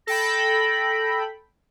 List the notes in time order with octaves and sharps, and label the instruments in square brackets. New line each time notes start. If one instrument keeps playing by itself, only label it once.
[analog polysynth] A4 G5 B5 [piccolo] A#6